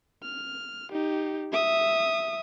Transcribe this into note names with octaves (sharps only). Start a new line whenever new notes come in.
F6
D#4 G4
E5 D#6